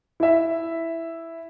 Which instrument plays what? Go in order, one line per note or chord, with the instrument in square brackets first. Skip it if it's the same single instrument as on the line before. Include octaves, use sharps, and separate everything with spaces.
[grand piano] E4 E5